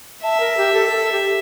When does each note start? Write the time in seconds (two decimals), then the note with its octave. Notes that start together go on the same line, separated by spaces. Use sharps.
0.23 E5 A5
0.40 A#4
0.57 G4
0.73 A4
0.90 A4
1.12 G4